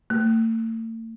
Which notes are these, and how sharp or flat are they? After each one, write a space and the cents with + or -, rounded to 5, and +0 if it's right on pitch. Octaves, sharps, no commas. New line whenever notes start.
A3 +45